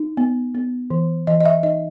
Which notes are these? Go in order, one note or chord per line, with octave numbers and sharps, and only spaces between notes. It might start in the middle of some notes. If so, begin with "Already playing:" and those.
Already playing: D#4
B3
B3
E3
E3 D#5
D#5
E5
D#4 D#5